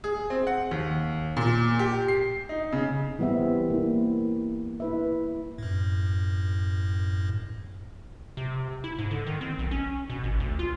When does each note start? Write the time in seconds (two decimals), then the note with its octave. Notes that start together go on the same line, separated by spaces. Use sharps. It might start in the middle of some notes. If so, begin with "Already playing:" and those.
0.04 G#4
0.30 C4
0.47 F#5
0.71 D#2
1.37 A#2
1.79 G4
2.08 C7
2.49 D#4
2.72 C#3
3.19 E3 G3 B3 C4 E5
3.70 A#3 E4
4.80 E4 B4 E5
5.58 F#2 A2
8.37 C3
8.84 E4
8.98 G#2
9.11 D3
9.26 D#3
9.41 C4
9.59 B1
9.71 C#4
10.10 B2
10.24 G#1
10.40 D2
10.59 F4